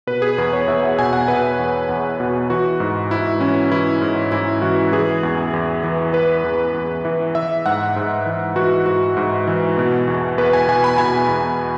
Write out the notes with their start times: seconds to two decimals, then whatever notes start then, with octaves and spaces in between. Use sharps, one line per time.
0.07 B2 B4
0.22 G#4
0.38 E2 B4
0.53 C#5
0.68 E2 E5
0.83 F#5
0.98 B2 G#5
1.13 F#5
1.28 B2 B4
1.59 E2
1.89 E2
2.20 B2
2.50 E3 F#4
2.80 G#2
3.11 G#2 E4
3.40 E3 C#4
3.72 E3 E4
4.02 G#2
4.32 G#2 E4
4.62 E3 F#4
4.93 E3 G#4
5.23 E2
5.53 E2
5.84 E3
6.13 E3 B4
6.44 E2
6.74 E2
7.05 E3
7.35 E3 E5
7.66 G#2 F#5
7.96 G#2
8.26 E3
8.56 E3 F#4
8.86 G#2 F#4
9.17 G#2
9.47 E3
9.77 B2
10.08 E2
10.38 E2 B4
10.53 G#5
10.68 B2 G#5
10.84 B5
10.98 B2 G#5
11.28 E2